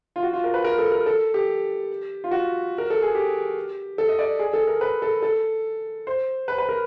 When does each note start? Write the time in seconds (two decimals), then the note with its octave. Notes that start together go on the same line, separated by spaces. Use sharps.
0.16 F4
0.23 F#4
0.33 F4
0.44 A#4
0.54 B4
0.64 A#4
0.79 A4
0.92 A#4
1.06 A4
1.34 G4
2.24 F4
2.31 F#4
2.78 A#4
2.90 A4
3.02 G#4
3.15 G4
3.98 A4
4.09 D#5
4.19 D5
4.39 G#4
4.53 A4
4.67 A#4
4.81 B4
5.02 A4
5.22 A4
6.07 C5
6.48 B4
6.58 B4
6.69 A#4